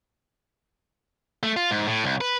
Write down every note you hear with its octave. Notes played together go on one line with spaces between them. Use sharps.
A3
F4
G#2
A2
C2
B4